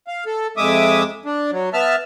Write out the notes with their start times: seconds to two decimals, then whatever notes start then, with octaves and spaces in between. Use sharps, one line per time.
0.07 F5
0.26 A4
0.57 F2 G#3 E5 D6 D#6
1.25 D4
1.52 F#3
1.73 B3 E5 A5 F6